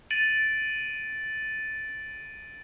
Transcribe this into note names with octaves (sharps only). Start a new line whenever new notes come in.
A6 D7 D#7 F#7